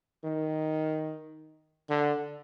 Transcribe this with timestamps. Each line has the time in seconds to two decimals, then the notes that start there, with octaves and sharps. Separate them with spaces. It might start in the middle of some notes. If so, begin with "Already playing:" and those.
0.24 D#3
1.90 D3